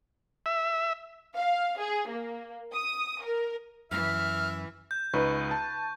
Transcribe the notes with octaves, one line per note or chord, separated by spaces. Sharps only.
E5
F5
G#4
A#3
D#6
A#4
F#2 E3 E5 F6
G6
C#2 D#4 B4 C#6
A5